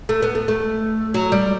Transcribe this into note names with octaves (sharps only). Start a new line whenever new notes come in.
A3
B3
A3
A3
F#3
G3